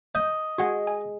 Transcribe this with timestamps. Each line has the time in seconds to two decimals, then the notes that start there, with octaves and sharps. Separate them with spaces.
0.15 D#5 G6
0.58 G#3 F#4 G#4 F#5 G#6
0.87 G#5